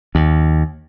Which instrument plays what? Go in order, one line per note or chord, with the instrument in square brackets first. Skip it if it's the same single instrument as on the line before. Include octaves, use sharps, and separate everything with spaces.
[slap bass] D#2